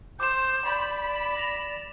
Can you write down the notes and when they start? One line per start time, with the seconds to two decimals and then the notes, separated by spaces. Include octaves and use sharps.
0.20 C5 D6 G6 E7
0.65 D5 B5
1.37 A#6 F7